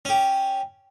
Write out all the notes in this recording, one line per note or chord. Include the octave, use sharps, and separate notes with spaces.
C#4 G4